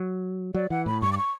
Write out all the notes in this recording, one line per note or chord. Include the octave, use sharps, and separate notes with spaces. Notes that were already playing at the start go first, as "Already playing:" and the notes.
Already playing: F#3
F#3 D5
E3 F#5
A2 B5
G2 C#6
D6
C#6